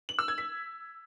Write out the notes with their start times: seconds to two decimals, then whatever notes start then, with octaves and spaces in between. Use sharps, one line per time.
0.09 F#7
0.19 E6
0.28 G#6
0.38 B6